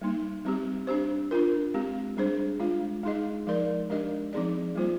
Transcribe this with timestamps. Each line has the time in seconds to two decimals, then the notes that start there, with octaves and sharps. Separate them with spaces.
0.01 G3 A#3 D#4
0.45 G3 C4 G4
0.87 D4 G4 C5
1.31 D4 F4 A#4
1.74 G#3 C4 G4
2.17 G3 D4 G#4 C5
2.60 G#3 D4 F4
3.03 G#3 D#4 G#4 D#5
3.47 F3 G#3 D#4 A#4 D5
3.90 G#3 D4 G4 A#4 D#5
4.33 F3 C4 D#4 G#4 D5
4.75 G3 A#3 F4 C5